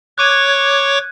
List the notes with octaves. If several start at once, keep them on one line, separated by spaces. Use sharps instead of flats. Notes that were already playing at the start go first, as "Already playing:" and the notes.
C#5 C#6 D6 F#6 G#6 D#7